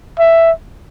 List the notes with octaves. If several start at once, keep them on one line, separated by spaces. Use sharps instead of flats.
E5